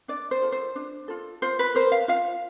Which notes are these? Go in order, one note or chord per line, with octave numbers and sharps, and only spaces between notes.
D4 D5
C5
F4 A4
C5
D4
F4 A4
F4 C5
B4
A#4 C5
F5
F4 F5